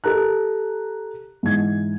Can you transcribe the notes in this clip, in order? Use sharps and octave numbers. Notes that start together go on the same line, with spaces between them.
G4 A4 A#4 A#5 F#6
G#2 E3 G#6